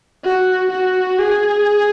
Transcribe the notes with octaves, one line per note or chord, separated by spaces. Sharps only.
F#4
F#4
G#4